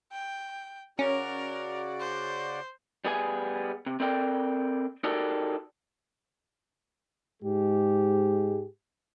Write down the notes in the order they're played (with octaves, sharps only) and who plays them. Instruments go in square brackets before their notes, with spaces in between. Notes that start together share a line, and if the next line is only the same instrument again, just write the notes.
[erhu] G5
[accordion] C#3 F#4 D5 [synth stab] C#4 [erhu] A#4
[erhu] C5
[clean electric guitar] G3 B3 G#4 G#5
C3
C4 A4 A#4 D5 F#5 G5
D#4 F#4 G4 A4 A#4 D5
[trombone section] G#2 G#3 G4 G#4